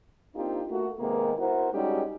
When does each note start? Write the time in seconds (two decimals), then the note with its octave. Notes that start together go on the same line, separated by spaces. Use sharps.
0.36 A#3 C4 D4 D#4 F4 G4
0.70 A3 A#3 F#4
1.00 C3 D#3 G#3 A#3 B3
1.38 B3 E4 F#4 A#4 C5
1.72 G3 G#3 C#4 D#4 F#4 G4